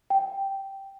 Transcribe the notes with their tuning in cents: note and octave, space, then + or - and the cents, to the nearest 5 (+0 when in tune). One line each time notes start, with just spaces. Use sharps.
G5 -5